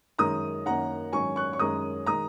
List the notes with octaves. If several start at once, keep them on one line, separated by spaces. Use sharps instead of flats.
F#2 D#3 G#3 C#4 A#5 D#6
F#2 D#3 A#3 C#4 F#5 A#5
G#2 D#3 F#3 C#4 G#5 C#6
C#6 F#6
C#6
F#2 D#3 G#3 C#4 A#5 D#6
D#3 G#3 A#5 D#6